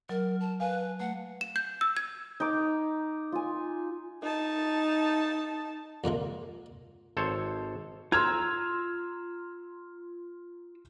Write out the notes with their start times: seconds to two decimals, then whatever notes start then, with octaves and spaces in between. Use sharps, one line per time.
0.09 F#3 A#4
0.41 A5
0.60 B4 F5 G#5
1.00 A3 F#5
1.41 E7
1.56 G6
1.81 E6
1.97 G#6
2.40 D#4 D6
3.32 F4 G#5
4.22 D#4 A5
6.04 F2 A#2 G#3 A#3
7.17 G#1 A4 C5 C#5
8.12 F4 A#5 C6 E6 F6 G#6